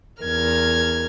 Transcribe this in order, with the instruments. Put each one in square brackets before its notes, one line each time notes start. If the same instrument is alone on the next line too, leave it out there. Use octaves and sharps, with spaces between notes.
[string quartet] E2 A#4 F6 G#6